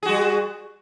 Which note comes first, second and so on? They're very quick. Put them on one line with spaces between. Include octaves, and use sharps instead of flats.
G#4 F#4 G3